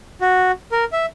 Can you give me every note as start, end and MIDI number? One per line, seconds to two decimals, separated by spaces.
0.21 0.52 66
0.72 0.84 70
0.92 1.06 76